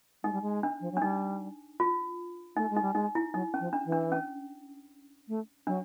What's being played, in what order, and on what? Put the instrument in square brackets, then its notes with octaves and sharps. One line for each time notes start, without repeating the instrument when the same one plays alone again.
[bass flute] G#3 [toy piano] D#4
[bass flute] G3
G#3
[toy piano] D4
[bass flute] F3
F#3
[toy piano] D4
[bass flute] G3 [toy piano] D#4
[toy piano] F4
[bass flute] A3 [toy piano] D#4
[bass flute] G#3
[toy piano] D#4
[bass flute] G3
[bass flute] G#3 [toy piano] D#4
[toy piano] E4
[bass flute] F#3 [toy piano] D#4
[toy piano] C#4
[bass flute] F3
[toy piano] D4
[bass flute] E3
[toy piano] D4
C#4
[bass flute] A3
[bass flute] F#3 [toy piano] D4